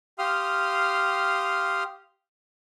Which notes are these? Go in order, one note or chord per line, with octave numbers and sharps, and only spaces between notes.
G4 F5 C6 D#6 F6